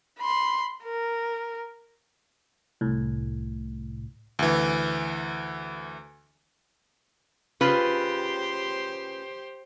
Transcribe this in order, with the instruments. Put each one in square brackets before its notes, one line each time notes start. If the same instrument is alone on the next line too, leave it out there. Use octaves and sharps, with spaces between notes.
[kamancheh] B5 C6
A#4
[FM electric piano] C2 A2
[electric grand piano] D2 E3
[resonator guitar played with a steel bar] C#3 F4 B4 [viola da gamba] G4 C5